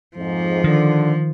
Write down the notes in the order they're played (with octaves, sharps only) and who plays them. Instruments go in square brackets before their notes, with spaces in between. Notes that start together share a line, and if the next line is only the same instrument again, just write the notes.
[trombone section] F2 G#2 [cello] F3
[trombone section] D3 [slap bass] D#3